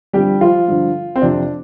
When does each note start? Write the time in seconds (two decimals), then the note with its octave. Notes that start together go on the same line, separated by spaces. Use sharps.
0.13 G2 D3 F3 G3 G4
0.41 F3 F4
0.68 G2 D3 F3
1.16 C4
1.22 F2 C3 F3 D4